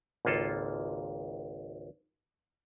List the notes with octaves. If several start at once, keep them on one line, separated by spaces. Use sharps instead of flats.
G#1 C#2 A#3 F4 A4